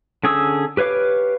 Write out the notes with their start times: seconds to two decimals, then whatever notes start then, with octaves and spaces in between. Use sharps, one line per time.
0.24 D3 C#4 G#4 D#6 E6
0.77 G4 B4 C#5 F5 D6